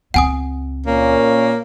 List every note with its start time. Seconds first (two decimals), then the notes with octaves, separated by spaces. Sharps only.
0.14 C#2 C4 F#5 G#5 D#6
0.86 A#2 A#3 C#4